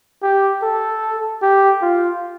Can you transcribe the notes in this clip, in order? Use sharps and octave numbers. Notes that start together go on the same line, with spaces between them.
G4
A4
G4
F4